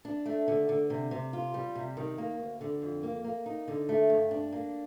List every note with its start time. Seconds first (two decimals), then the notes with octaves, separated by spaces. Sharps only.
0.05 D4
0.26 A3
0.48 D3
0.69 D3
0.90 C3
1.11 C3
1.33 F4
1.54 G3
1.75 C3
1.97 D#3
2.18 A#3
2.39 D2
2.61 D3
2.82 F2
3.03 A#3
3.24 A#3
3.46 D#4
3.68 D3
3.89 A3
4.10 G2
4.31 D4
4.52 A#3